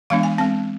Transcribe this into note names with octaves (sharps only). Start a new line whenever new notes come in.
E3 G#3 B3 D4 F5
G#5
G#3 C4 A5